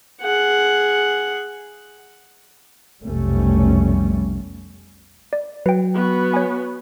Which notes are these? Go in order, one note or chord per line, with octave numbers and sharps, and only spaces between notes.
G#4 F#5
F1 B1 G3 A3 C#4
D5
F#3 B4 G5
B3 F#4
C#5 G#5